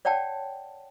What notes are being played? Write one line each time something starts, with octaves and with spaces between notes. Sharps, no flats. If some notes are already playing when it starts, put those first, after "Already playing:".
C#5 D5 F#5 G5 A5